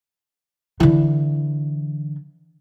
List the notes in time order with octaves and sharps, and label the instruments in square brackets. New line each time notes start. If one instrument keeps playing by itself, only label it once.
[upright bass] D3 E3